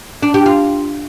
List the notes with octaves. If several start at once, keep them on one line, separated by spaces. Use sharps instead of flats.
D4
G4
F4